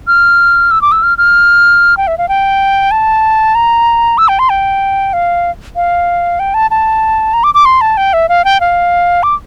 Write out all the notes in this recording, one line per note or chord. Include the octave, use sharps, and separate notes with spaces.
F6
E6
D6
E6
F6
F6
G5
E5
F5
G5
A5
A#5
E6
G5
C6
G5
F5
F5
G5
A5
A5
A#5
D6
D6
C6
A5
G5
E5
F5
G5
F5
D6